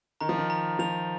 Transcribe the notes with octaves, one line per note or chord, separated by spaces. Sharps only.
D#3 A#5
F3
D#3
A#5
F3 F7